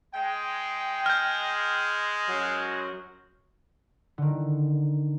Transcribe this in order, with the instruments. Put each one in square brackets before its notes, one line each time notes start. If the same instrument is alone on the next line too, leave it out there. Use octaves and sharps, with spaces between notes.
[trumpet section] G#3 [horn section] G5
[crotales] F6 G6
[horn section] F#2 F#3 F#4
[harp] D3 D#3